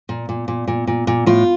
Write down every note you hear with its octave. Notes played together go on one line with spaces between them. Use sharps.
A#2
A#2
A#2
A#2
A#2
A#2
A2 F4